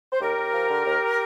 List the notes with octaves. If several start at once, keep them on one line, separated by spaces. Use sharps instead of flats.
C5
D#2 G4 A#4
D#2
F3
D3
D#2